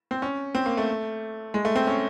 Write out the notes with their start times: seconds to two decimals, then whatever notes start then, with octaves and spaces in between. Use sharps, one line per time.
0.11 C4
0.22 C#4
0.55 C4
0.66 A#3
0.77 A3
1.54 G#3
1.65 A3
1.76 C4
1.87 C#4